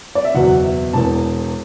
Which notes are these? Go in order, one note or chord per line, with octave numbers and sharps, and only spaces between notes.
D5
E5
F#1 E2 B2 F#3 F#5
E5
E1 E2 E3 A5